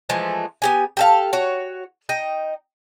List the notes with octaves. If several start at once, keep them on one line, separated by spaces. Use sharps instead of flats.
E3 F3 G#3 A3
B3 G4 G#5
G4 A4 F5
F#4 C#5
D#4 D#5 G5